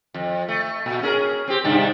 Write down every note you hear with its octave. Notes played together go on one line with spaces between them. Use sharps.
F2
A3
A#2
C#4 G#4 A#4
C4 G4
G2 C3 D4